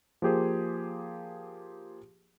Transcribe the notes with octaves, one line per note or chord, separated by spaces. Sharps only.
F3 A#3 G4 G#4 C5